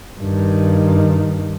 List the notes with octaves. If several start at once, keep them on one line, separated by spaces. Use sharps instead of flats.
G2 D#3